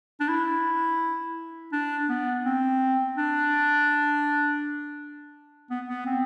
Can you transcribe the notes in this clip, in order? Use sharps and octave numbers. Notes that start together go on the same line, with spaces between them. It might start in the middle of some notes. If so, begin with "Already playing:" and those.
D4
E4
D4
B3
C4
D4
B3
B3
C4